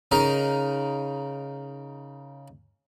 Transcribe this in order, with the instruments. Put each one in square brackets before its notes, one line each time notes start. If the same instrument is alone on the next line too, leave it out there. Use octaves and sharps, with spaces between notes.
[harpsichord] C#3 D#4 A#4